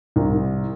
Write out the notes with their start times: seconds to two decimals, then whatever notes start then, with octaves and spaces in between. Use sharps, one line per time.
0.16 C2